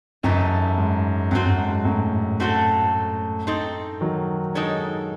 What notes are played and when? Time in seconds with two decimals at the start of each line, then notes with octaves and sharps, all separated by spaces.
0.23 F#2 C#3 E3 A3 D#4 A4
0.78 G#2
1.31 F#2 F#3 A3 C4 F#4
1.45 F#2
1.58 G#2
1.72 G#2
1.85 F#2 A2
2.40 A3 C4 F#4 A4
3.47 C4 D#4 A4
4.01 D#3 F#3
4.55 G#3 D#4 A4 C#5